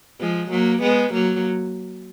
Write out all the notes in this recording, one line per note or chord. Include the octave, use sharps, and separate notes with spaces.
F3 G#3
F#3 A#3
G#3 B3
F#3 A#3